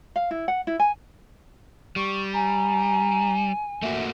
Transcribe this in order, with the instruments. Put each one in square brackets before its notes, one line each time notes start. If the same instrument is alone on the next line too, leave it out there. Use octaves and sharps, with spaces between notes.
[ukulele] F5
E4
F#5
E4
G#5
[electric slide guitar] G3 [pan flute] C#6
[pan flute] G#5 [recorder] A#5
[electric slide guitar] A3 A#3 F#4 [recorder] E5